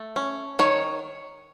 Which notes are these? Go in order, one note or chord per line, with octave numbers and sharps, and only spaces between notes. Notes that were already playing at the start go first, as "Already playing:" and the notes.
Already playing: A3
C#4
D#3 C#5